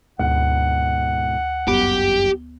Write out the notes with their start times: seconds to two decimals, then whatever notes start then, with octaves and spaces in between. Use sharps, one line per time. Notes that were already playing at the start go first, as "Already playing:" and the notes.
0.20 D2 G#2 B2 F#5
1.68 G1 F#2 B3 G4